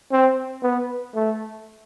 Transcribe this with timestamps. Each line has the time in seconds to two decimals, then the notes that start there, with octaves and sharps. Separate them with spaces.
0.12 C4
0.63 B3
1.15 A3